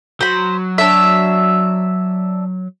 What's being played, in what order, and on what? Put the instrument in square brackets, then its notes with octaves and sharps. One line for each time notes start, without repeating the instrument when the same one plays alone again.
[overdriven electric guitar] F#3 [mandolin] C5 B5
[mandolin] D4 C#5 E5